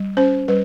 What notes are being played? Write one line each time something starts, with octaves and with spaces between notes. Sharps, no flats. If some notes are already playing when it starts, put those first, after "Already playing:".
Already playing: G3
C#4 C5
G3 B4